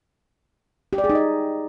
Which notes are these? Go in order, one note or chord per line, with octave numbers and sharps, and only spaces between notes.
G4
D5
G#4
D#4
D#5